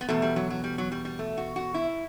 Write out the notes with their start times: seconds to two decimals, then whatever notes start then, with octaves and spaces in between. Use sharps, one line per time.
0.01 B3
0.09 E2 B2 A3
0.22 G3
0.36 F#3
0.50 F#3
0.64 G3
0.78 F#3
0.92 G3
1.05 G3
1.19 A3
1.38 F#4
1.56 F#4
1.74 E4